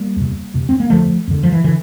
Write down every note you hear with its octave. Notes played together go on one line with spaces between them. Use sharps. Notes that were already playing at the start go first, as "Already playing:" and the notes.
Already playing: G3 A#3
E2 C3
E2 C3
C4
A#3
E2 D3 F3 A3
E2 D3
F3
E3
D3 E3